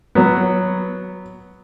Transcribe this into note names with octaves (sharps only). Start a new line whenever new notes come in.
F#3 B3